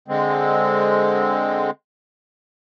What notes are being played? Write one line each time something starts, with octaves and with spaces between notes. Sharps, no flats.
D3 G#3 C4